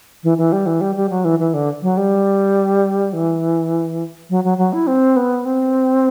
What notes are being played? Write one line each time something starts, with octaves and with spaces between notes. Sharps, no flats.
E3
E3
G3
E3
G3
G3
F#3
E3
E3
D3
F#3
G3
E3
F#3
F#3
F#3
E4
C4
B3
C4